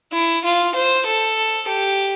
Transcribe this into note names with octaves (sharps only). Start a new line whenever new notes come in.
E4
F4
C5
A4
G4